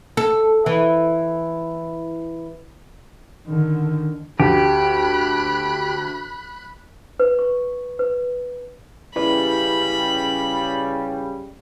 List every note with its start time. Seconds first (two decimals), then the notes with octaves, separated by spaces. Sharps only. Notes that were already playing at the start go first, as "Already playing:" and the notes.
0.17 A4
0.66 E3
3.47 D3 D#3
4.40 D2 G4 B5 F#6
7.19 B4
7.39 C#6
7.99 B4
9.16 C#3 G3 E4 B4 D5 B5